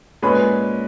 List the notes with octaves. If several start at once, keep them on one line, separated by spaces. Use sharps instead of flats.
A#2 G#3 C#4 B4 B5